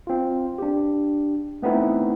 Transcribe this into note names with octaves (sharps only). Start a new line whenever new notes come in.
C4 F4
D4 G4
A3 B3 C4 D#4 E4